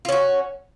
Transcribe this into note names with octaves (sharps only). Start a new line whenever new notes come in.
C#4 F4 F#4